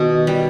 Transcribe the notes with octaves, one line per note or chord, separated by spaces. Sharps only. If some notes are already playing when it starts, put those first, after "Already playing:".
Already playing: B2 D#3
G3